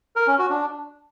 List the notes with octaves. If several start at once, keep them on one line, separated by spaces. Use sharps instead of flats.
A#4
C#4
F#4
D4